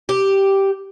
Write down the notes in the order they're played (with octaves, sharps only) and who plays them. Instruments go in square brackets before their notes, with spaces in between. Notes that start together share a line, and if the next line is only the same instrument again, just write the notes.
[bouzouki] G4